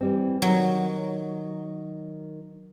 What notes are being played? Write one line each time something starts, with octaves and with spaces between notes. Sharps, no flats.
E3 G3 C4
D#3 F#3